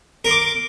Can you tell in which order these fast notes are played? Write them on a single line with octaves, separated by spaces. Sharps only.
A#4 C6 D6